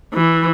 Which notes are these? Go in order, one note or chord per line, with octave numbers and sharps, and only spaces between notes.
E3